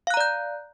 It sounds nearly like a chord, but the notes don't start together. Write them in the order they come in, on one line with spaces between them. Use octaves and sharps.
F5 F#6 A#5 D5 G6